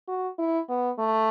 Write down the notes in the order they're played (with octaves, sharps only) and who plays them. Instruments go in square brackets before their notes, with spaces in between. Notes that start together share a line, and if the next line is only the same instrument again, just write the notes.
[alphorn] F#4
E4
B3
A3